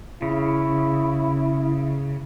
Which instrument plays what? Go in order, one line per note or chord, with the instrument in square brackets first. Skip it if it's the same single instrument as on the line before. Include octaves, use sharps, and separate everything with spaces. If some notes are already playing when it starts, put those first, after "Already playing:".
[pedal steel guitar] C#3 [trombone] E4